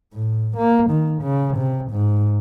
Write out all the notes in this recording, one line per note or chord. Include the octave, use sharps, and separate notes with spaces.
A2
A#3
D#3
C#3
C3
G#2